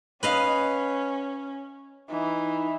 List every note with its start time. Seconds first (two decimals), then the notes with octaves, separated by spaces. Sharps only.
0.23 C#4 B4 D#5 F5
2.10 E3 D#4